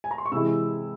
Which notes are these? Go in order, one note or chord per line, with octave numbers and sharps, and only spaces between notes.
G#5
A#5
C6
C#6
C3 E3 G#3 E4 E6